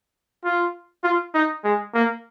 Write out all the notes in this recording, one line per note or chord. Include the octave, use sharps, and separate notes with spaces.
F4
F4
D#4
G#3
A#3